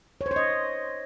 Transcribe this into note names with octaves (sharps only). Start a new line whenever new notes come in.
C#5
C5
C#5
D#5